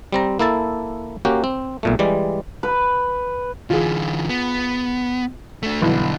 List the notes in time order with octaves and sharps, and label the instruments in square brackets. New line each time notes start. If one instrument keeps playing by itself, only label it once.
[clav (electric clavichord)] G3 C4 A#5
A#3 E4 A4 A5
A#3 C#4 F#4 G4
C4
B1 A#2 A3
E3 G3 G#3 D5
[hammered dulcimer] B4
[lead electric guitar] D3 E3 [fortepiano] F4 G#4
[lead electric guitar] B3
A3 D4
[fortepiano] B1 E3 [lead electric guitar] G2 D3